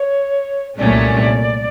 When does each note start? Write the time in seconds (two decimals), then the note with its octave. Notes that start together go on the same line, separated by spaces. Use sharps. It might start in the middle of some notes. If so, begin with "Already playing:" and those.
Already playing: C#5
0.79 C2 A#2 F#3 A3 C#4 D5